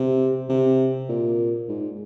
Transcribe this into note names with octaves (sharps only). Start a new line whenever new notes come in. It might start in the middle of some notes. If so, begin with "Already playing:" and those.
Already playing: C3
C3
A#2
G#2